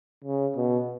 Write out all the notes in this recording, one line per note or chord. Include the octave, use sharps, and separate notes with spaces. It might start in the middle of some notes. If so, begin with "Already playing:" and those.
C#3
B2